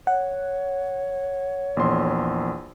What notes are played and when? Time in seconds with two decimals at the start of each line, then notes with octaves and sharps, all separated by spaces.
0.07 C#5 F#5
1.77 A#1 E2 C6